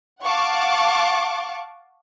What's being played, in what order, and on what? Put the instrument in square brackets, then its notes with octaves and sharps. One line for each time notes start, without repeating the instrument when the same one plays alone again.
[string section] F5 F#5 A5 C#6 D6